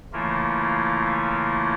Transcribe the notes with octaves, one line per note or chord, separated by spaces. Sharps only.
C#3 E3 A3 A#3 E4 F4